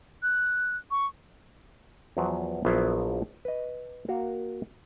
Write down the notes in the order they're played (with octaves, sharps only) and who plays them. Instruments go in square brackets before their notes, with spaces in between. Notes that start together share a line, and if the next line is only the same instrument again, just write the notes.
[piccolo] F#6
C#6
[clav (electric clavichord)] E2 F3 F#3 B4 C5
A#1 F3 F#3 B3 E4 F5
B4 D#5
A#3 F#4 A#4 F5